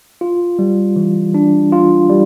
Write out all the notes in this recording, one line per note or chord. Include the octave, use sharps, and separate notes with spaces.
F4
G3
E3
D4
F4
G3